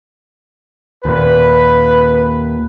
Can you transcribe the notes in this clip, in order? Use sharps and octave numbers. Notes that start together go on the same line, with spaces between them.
D#2 A#2 B4